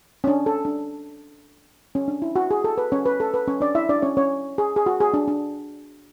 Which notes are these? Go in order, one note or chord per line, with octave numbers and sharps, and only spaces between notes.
C#4
D4
A4
D4
C#4
D4
E4
F#4
G#4
A4
B4
C#4 C#5
B4
A4
B4
C#4 C#5
D4 D5
E4 E5
D4 D5
C#4 C#5
C#4 C#5
G#4
G#4
F#4
G#4
D4
D4